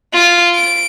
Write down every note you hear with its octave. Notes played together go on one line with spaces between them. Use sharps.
F4
D7